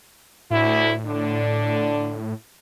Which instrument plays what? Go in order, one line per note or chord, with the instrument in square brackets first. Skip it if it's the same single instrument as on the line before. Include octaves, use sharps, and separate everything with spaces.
[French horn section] D2 E4 [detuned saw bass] A2
[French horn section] D3 D4